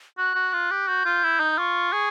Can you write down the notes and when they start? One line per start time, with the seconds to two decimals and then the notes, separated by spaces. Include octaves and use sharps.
0.18 F#4 F#6
0.35 F#4
0.53 F4
0.71 G4
0.88 F#4 G6
1.05 F4
1.23 E4
1.40 D#4
1.58 F4 C#6
1.93 G#4